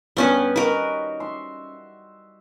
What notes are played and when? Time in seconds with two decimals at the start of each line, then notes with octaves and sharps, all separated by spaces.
0.17 G2 B3 C#4 B4
0.56 D#3 F#4 A#4 B4
1.20 E5 C6